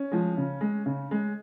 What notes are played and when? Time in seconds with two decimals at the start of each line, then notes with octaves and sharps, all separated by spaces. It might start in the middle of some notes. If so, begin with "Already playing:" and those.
Already playing: C#4
0.12 F3 G#3
0.37 C#3
0.61 G#3
0.86 C#3
1.11 G#3